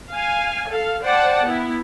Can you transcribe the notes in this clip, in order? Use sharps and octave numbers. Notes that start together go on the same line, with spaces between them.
F5 G#5
A4 F5
C5 D5 F#5 G5 A5
B3 E4